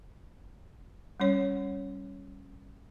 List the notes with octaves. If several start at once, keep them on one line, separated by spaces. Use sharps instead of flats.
G3 C#4 C#5